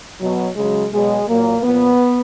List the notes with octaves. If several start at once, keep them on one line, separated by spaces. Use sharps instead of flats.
B2 F#3
C#3 F#3 G#3
B2 F#3 G#3
A#2 F#3 A#3
A#2 F3 B3